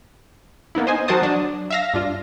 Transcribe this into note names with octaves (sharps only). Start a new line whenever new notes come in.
A#3 B3 D#4 E4
C5 D#5 G#5
F#3 F#4 A#4 C5 A5 D#6
F#3 D4
E5 F5 A#6
G2 D4 F4